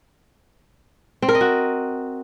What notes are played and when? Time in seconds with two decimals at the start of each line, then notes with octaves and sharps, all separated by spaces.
1.22 C4
1.29 A#4
1.35 D#5
1.41 F#4